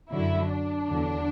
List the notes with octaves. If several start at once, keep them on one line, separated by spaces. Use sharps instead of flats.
F#2 D3 F#3 E4
D4
E2 D3 F#3